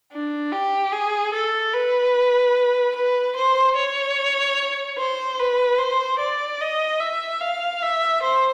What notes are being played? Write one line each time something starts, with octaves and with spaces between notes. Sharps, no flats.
D4
G4
G#4
A4
B4
B4
C5
C#5
C5
B4
C5
D5
D#5
E5
F5
E5
C5